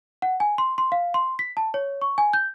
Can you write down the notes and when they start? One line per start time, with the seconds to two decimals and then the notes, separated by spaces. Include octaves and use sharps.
0.22 F#5
0.40 G#5
0.58 C6
0.78 C6
0.92 F5
1.14 C6
1.39 B6
1.57 A5
1.74 C#5
2.02 C#6
2.18 G#5
2.33 G6